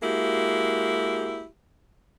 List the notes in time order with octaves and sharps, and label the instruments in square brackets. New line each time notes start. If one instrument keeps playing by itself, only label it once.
[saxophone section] G#3 A#3 E4 F#4 G4